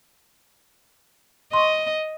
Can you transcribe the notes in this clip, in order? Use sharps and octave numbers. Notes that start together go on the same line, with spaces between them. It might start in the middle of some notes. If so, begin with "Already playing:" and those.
D#5 C6 C#6